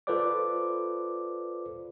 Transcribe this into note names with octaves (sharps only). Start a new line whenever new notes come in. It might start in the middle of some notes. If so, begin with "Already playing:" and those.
F4 A4 B4 C5 D5 D6